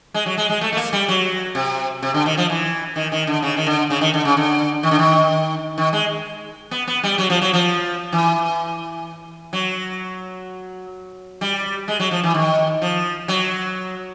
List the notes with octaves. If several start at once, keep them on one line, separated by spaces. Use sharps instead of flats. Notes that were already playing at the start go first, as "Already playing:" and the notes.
G#3
F#3
G#3
G#3
A3
A3
A#3
G3
F#3
C3
C3
D3
D#3
F3
E3
D#3
D#3
D3
C#3
D#3
D3
C#3
D#3
D3
C#3
D3
D#3
D3
D#3
D#3
G#3
B3
B3
G3
F#3
F3
F#3
F3
E3
F#3
G3
G#3
F#3
F3
E3
D#3
F3
F#3